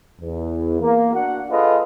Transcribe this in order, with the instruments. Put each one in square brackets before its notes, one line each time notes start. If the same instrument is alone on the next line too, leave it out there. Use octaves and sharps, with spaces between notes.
[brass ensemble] E2
A#3
D4 F#4 F#5
F4 G#4 A4 B4 D#5